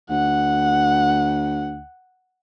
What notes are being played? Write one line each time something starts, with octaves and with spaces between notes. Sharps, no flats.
D2 F#5